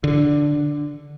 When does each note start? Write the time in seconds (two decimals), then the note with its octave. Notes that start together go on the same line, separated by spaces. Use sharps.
0.04 D3